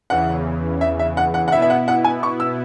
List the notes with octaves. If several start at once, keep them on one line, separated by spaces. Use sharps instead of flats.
E2 C#3 E3 F#5
E5
E5
F#5
F#5
F#5
B2 B3 E4 E5
E5
F#5
F#5
G#5
C#6
E6